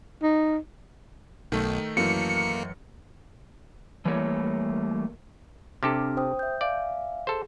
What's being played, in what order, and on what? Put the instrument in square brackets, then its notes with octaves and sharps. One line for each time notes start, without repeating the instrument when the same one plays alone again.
[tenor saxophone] D#4
[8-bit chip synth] B1 [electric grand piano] D#3 A3 D#4
[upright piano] F#2 E3 [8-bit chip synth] A#3 [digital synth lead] C#7
[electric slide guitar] E3 G3 A3 A#3 C#5
[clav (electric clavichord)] C3 G4 A4 [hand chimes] C4 D4 F6
[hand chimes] C5 G5 D#6
E5 G6
[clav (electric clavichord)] D5 [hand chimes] E5 F5 G#5
[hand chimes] G#4 [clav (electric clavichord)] A4 C5